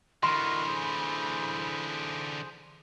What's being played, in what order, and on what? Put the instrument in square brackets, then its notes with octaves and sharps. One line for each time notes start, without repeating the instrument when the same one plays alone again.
[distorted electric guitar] D3 E3 [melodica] F#4 A#4 D#5 [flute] B5 [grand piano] C6
[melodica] G#4 C5